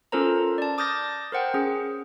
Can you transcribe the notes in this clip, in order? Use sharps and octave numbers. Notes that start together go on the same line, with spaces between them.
C#4 F4 A4 A#4 C5 A#5
D5 A5
D6 D#6 F6 G6 A6 A#6
A#4 C5 F#5 G5
C#4 G#4